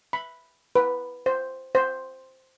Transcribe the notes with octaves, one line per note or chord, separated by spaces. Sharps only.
B5
B4
C5
C5